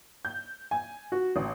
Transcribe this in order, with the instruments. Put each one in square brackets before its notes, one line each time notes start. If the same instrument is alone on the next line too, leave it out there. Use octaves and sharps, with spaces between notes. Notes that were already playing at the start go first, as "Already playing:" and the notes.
[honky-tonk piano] G6
G#5
F#4
A1